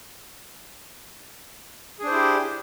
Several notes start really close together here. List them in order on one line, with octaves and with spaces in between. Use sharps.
G#4 D4 C5 E4 G4